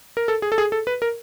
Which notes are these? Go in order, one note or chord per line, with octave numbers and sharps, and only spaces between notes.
A#4
A4
G#4
A4
G#4
A4
B4
A#4